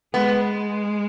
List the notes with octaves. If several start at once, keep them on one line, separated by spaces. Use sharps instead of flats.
G#3 B3